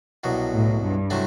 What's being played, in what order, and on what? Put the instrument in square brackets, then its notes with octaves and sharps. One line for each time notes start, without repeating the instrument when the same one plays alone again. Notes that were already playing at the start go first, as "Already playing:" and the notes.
[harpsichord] C2 B2 F#3
[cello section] A2
G2
[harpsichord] C3 F#3 A3 E4